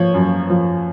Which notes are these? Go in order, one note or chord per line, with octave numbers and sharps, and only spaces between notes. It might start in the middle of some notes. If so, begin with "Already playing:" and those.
Already playing: F3 C#5
F#2
F3